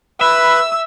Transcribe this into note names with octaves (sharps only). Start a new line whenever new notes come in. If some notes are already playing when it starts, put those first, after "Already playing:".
B4 E5 B5 E6